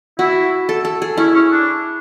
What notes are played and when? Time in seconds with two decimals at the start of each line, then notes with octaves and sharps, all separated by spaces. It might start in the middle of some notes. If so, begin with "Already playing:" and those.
0.19 E4 F#4
0.69 A4
0.85 A4
1.02 G#4
1.17 C#4 E4
1.34 C#4
1.51 D4